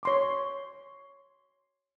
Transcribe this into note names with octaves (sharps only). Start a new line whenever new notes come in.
C#5 C6 D6